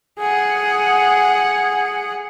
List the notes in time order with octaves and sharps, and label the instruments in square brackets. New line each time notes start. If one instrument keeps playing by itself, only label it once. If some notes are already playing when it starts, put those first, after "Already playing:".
[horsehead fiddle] G#4 F#5